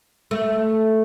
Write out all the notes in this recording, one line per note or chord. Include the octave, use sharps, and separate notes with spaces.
A3